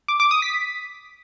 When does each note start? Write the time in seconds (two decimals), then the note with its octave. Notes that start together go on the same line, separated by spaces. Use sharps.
0.08 D6
0.20 D6
0.31 D#6
0.42 B6